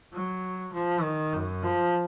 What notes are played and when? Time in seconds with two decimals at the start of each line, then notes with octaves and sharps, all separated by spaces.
0.14 F#3
0.73 F3
1.03 D#3
1.33 F#2
1.63 F3